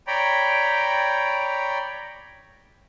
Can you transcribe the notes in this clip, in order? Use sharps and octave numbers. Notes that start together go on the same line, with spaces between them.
C#5 D5 G5 A#5 B5